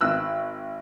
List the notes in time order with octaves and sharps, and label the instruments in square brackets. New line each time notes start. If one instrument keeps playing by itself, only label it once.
[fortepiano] G#1 E6 F#6